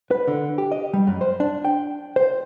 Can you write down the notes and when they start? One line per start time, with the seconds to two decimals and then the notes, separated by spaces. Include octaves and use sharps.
0.11 B4
0.27 D3
0.58 G4
0.72 D#5
0.93 G3
1.07 F#2
1.21 C5
1.40 D4
1.65 G5
2.16 C5